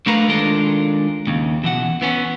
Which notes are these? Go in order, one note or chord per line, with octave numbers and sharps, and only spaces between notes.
D3 A3 A#4 B4 F5 A#5
D#3 G#3 D4 F4 A4 A#4
D#2 C#3
B2 E3 F#5
E3 B3 C#4